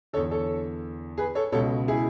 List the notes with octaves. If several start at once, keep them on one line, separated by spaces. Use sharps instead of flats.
E2 D3 A4 C#5
A4 C#5
G#4 B4
A4 C#5
C#2 B2 A4 C#5
E4 G#4